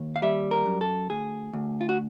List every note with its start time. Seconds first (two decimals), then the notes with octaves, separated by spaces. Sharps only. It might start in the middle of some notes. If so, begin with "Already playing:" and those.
Already playing: D#2
0.16 F5
0.22 G3 E5
0.51 A#4
0.66 F#2
0.81 A4
1.10 D2 G#4
1.53 D2
1.81 F4
1.89 F#4